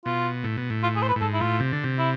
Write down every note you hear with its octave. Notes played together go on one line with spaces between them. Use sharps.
B2 F4
A2
B2
A2
F4
G#4
C5
B4
A2
G#2 A4
E4
A2 F4
C3
D3
C3
E4